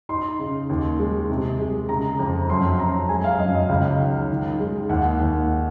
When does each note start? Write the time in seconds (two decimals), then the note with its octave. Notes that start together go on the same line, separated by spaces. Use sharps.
0.09 D#4 C6
0.39 C#3
0.69 D#2
0.99 G#3
1.30 C3
1.59 G#3
1.89 C#3 A#5
2.19 F2
2.49 F#2 C6
2.79 F#2 A#5
3.09 G#3 G#5
3.24 F5
3.39 F#2 D#5
3.55 D#5
3.69 C#2 F5
4.00 D#3
4.30 D#3
4.60 G#3
4.89 D#2 F#5
5.20 D#2